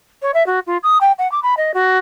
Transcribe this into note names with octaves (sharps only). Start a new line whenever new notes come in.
C#5
E5
F#4
F4
D#6
G5
F#5
D6
B5
D#5
F#4